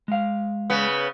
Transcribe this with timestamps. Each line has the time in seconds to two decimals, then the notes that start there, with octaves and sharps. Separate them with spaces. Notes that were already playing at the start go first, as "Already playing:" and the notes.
0.08 G#3 F5
0.70 C#3 B3